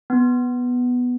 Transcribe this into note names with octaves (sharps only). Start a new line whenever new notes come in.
B3